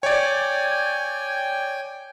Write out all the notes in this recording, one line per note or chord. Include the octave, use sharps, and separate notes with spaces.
C#5 D5 G5 G#5